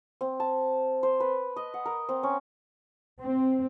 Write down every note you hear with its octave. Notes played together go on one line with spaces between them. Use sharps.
C4
A5
C5
B4
D#5
F#5
A#4
C4
C#4
C4